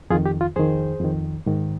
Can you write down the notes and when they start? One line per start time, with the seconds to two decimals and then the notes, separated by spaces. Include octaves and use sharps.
0.10 F2 D#3 F4 G#4
0.26 G4
0.41 F4
0.56 F2 D#3 G#4 C5
1.00 F2 D#3
1.46 G#2 D#3